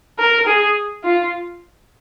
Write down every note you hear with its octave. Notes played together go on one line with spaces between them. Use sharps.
A#4
G#4
F4